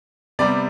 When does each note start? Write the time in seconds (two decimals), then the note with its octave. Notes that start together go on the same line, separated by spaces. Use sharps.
0.39 C3 G3 B3 D5